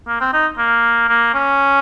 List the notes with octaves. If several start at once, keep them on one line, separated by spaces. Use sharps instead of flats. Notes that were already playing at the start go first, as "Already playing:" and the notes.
A#3
C4
D#4
A#3
A#3
C#4